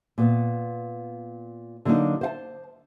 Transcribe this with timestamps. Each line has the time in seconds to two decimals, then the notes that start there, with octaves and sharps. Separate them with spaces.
0.18 A#2 B3
1.85 D3 F#3 A#3 D4 D#4
2.21 C5 F5 A5